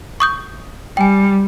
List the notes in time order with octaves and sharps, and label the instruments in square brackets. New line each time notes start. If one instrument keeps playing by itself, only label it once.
[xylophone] C#6 D#6 G6
[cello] G3 [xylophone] G5 G#5